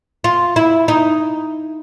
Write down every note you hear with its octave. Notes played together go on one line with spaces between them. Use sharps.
F4
E4
D#4